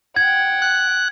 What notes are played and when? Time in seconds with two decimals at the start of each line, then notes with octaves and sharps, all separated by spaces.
0.16 F#5 G5 G#6
0.62 F#6